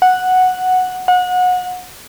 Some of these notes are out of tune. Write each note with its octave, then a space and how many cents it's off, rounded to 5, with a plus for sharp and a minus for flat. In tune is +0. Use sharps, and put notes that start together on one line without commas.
F#5 -5
F#5 -30